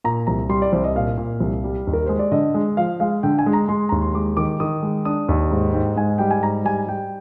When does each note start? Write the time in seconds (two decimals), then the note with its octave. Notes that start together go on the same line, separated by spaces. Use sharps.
0.04 A#2 A#5
0.27 C2 A#5
0.49 G3 C6
0.62 D5
0.72 C2 C5
0.84 D#5
0.96 A#2 F5
1.18 A#2
1.40 C2
1.64 G3
1.87 D#2
1.93 A#4
2.06 G#3 C5
2.19 D5
2.32 D3 D#5
2.54 G#3
2.77 F3 F5
3.00 G#3 F5
3.23 D3 G5
3.39 G#5
3.46 G#3
3.53 A#5
3.69 G#3 C6
3.89 D#2 A#5
4.02 C6
4.14 G#3 D6
4.37 D#3 D6
4.60 D#3 D#6
4.82 G#3
5.05 D4 D#6
5.29 D#2
5.51 G#2
5.74 G#2 G5
5.96 G#2 G#5
6.18 G3 G5
6.31 G#5
6.43 G#2 A#5
6.65 G3 G#5
6.87 G3 G5